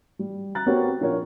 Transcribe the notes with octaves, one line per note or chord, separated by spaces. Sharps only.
G3
A#5 F#6 A6
B3 C4 F#4 G4 A#4 C#5
A#1 F4 A#4 C#5